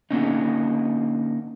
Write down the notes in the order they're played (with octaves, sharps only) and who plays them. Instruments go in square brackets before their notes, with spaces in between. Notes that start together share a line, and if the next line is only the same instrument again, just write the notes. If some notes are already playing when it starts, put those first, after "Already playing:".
[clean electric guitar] D3 A#3 C#4 D#4